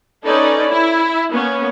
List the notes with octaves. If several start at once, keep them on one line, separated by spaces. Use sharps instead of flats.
C#4 D#4 A4 B4 D5
E4
A#3 B3 C#4